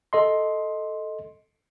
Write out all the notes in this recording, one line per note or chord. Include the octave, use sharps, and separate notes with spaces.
A4 D#5 C6